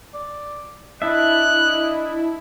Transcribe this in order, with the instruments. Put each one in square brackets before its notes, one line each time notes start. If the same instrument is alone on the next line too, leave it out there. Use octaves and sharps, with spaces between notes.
[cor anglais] D5
[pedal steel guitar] D4 E5 [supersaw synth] E4 [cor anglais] D#5 [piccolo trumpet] F#6